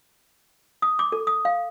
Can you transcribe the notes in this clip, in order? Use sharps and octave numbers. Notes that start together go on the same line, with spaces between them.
D#6
D6
A4
D#6
F5